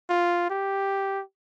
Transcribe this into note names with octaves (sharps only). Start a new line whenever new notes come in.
F4
G4